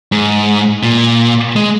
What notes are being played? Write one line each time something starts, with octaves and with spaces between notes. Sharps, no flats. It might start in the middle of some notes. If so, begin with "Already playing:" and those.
G#2
A#2
G#3